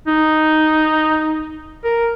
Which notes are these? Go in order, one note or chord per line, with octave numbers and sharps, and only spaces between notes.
D#4
A#4